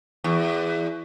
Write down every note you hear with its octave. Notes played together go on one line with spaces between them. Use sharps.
E2